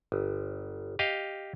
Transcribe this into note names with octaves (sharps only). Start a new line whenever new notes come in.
G1
G4 D#5 F5